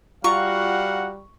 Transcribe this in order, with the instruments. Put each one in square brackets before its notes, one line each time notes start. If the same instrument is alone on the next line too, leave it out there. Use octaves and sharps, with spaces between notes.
[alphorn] G3 [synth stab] F4 A#5 [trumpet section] F#4 F5 F#5 [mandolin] C#6